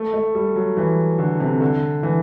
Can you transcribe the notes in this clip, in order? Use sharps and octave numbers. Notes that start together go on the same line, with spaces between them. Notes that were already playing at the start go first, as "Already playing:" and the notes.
Already playing: A3
A3
G3
F#3
E3
D3
C3
D3
E3